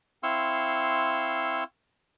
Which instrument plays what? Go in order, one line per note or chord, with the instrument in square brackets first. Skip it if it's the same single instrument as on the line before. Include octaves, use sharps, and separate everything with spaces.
[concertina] C4 E4 F5 C6 C#6 E6